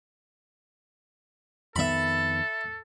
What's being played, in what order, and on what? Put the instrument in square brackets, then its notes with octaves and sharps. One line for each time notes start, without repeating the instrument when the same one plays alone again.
[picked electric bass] F2 D#3 B3 [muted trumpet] A4 [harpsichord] E5 B5